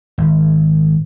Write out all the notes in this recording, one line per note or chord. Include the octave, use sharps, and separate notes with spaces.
G#1